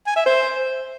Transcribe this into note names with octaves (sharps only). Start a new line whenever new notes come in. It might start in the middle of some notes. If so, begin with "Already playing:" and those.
G#5
E5
C5